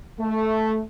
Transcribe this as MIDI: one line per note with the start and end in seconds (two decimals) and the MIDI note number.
0.20 0.81 57